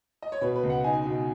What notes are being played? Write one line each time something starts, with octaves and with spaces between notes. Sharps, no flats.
D#5
C#5
B2 B4
B4
C#2
F#5
D#4 G#5
B2